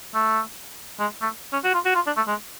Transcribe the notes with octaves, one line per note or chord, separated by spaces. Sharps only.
A3
G#3
A3
C#4
F#4
F4
F#4
F4
D4
A3
G#3